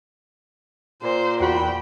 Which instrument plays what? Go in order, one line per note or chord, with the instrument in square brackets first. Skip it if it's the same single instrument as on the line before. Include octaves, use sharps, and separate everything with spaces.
[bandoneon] A#2 [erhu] C5
[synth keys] E2 F#4 B5 [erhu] G5